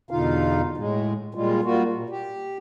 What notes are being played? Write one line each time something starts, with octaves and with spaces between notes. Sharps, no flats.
E2 B2 D3 D#4 F4 F5
A2 G#3
A#2 G3 G#3 F4
G3 A#3 F4 F#4
A#2
G4